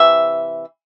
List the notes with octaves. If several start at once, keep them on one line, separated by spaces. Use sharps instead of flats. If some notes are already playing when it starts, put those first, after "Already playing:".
Already playing: C3 E3 E5